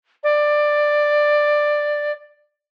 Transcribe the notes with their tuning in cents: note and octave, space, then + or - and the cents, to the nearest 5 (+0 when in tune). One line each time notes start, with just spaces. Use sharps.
D5 +10